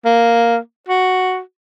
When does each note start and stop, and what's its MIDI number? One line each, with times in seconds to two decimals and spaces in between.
0.05 0.58 58
0.88 1.39 66